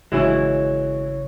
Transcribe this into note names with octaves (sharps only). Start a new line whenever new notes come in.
G#1 C#3 E3 F#3 G#3 E4 C#5